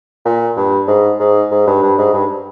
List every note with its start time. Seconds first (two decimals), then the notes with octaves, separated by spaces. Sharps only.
0.25 A#2
0.57 G2
0.88 G#2
1.19 G#2
1.51 G#2
1.67 G2
1.83 G2
1.98 G#2
2.13 G2